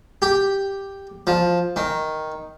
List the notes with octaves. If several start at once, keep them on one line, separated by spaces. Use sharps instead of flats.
G4
F3
D#3